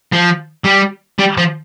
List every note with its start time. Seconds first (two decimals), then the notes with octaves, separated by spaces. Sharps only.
0.12 F3
0.65 G3
1.19 G3
1.38 F3